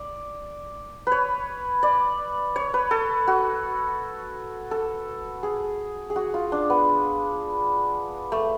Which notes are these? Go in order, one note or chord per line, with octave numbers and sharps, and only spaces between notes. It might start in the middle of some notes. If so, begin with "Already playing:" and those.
Already playing: D5
B4 C#5
D5
C#5
B4
A4
F#4
A4
G#4
G#4
F#4
F4
D4
B3
A3